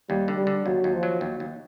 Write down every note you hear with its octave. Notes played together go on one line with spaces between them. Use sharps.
D#2 G3
D3
G3
D3
D#2 F#3
D#2
F3
F#3
D#2
D#2